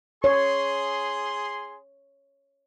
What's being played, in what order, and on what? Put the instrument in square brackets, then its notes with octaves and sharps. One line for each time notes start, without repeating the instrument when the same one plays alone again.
[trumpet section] G#4 C6 [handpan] C#5